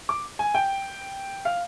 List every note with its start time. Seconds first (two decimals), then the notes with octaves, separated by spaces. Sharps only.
0.09 D6
0.39 G#5
0.55 G5
1.45 F5